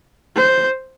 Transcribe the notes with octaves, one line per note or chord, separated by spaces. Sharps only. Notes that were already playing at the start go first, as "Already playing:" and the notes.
C5